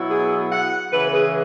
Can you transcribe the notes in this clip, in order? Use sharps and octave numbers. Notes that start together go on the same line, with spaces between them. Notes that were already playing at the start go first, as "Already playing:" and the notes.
Already playing: B2 F#3 B3 E4
G#4
F#5
C#3 E3 G#3 B4
B4
G#4